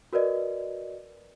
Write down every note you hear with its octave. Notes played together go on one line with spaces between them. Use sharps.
F#4 A#4 B4 D5 D#5